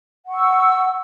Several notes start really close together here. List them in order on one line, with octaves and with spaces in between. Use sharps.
F#5 C#6 E6